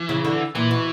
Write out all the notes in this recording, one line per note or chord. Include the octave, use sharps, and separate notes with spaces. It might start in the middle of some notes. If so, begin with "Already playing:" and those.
Already playing: E3
C#3
D3
A#2 E3
B2